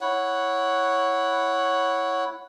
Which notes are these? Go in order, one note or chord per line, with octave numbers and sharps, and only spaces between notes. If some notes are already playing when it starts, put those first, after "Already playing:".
E4 C#5 F#5